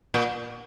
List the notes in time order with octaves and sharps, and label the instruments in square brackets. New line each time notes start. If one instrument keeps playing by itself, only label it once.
[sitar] A#2